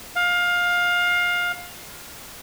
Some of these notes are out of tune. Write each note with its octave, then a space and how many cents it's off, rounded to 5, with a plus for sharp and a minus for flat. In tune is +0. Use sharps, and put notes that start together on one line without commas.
F5 +20